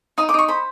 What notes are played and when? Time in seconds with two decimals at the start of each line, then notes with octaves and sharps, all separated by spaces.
0.18 D#4 D#6
0.29 D6
0.34 D#4 C#6
0.48 C5 B5